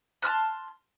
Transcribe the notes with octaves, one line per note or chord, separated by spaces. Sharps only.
A5 C6 F6 F#6